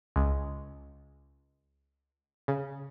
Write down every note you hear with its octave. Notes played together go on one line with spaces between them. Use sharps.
C#2
C#3